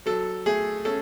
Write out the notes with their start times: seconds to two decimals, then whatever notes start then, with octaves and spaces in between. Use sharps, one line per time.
0.06 F#3 A4
0.46 A3 G#4
0.85 C#4 A4